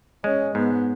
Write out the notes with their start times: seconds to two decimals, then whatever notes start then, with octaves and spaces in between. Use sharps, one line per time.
0.24 G#3 C#4
0.55 G#2 B3